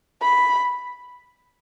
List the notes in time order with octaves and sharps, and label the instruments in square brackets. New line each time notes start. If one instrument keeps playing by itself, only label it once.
[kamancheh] B5